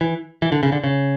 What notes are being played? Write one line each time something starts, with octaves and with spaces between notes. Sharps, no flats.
E3
E3
D3
C#3
D3
C#3